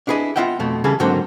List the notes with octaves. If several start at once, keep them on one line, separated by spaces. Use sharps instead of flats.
D4 E4 G#4 B4 D#5
B3 F4 D#5 E5 F#5 G5
F2 B2 A3
C#3 E3 G3 E4 G#4 A4
G#2 D3 F#3 A#3 C4 C5